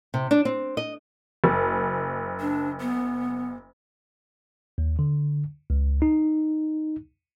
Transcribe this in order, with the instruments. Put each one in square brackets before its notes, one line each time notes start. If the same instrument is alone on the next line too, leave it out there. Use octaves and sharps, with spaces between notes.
[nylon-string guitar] C3
D4
C4
D#5
[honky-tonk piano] F#1
[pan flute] D4
B3
[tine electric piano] D#2
D3
C#2
D#4